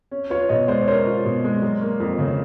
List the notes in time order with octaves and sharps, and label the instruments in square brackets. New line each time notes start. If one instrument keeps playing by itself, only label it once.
[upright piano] C#4
[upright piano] F4 [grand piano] B4 C#5
[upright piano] B2 [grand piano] C#5 D#5
[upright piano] G#3 [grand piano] C5 D5
[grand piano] C#5
[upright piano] C#4 [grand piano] A#4 C5
[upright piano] F4
B2
G#3
F#3
A#3
F2
C#3